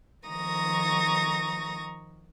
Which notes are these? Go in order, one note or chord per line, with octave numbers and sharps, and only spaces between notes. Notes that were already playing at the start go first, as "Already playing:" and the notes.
D#3 F3 A#5 C#6 D#6 A#6